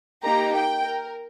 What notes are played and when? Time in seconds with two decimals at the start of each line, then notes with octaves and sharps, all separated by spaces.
0.24 A#3 D#4 G4 A#5
0.54 G5
0.82 A#4